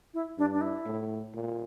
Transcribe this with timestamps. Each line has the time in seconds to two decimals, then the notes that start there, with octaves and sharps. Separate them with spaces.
0.14 E4
0.37 G2 D4
0.53 D4
0.61 E4
0.86 A2
1.34 A#2